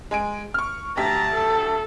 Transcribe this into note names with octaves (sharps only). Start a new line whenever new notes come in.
G#3 G#5 D7
C#6 F6
D2 G4 A5 A#5 B6
A4